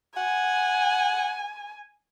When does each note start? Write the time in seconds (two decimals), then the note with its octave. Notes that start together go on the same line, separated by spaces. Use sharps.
0.17 F#5 G#5